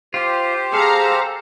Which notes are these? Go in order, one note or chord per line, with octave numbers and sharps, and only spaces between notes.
F4 G4 C5
G#4 A4 F5 A#5